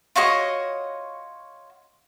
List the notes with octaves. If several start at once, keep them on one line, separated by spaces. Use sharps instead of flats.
F4 F#4 C#5 D#5